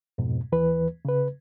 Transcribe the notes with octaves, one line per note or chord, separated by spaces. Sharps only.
F2 G#2 B2
D#2 E3 B4
C#3 B4